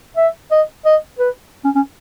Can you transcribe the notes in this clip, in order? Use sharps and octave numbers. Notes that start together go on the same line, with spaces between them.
E5
D#5
D#5
B4
C#4
C#4